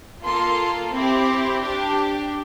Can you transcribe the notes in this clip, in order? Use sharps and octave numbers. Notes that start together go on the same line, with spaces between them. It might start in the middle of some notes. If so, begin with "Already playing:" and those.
A#3 F4 A4 C6
C4 E4 G4
D4 G4